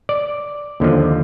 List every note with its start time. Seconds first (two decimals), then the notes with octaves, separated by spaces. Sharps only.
0.09 D5
0.80 D#2 D3 F3